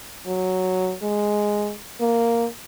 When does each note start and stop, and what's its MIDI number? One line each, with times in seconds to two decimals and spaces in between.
0.27 0.94 54
1.02 1.73 56
2.01 2.46 58